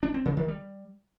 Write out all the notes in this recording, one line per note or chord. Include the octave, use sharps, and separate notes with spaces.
D4
C4
C#3
D#3
G3